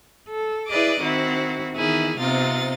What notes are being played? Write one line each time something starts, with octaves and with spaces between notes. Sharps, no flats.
A4
E4 G#4 B4 D5 D#5 D6
D#3 C4 E4 F#4
D#3 E3 B3 E4 G#4
C3 B3 C4 D#4 F4 A6